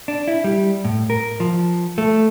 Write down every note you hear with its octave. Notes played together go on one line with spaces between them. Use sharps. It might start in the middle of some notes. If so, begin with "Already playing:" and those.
D4
E4
G3
A2
A#4
F3
A3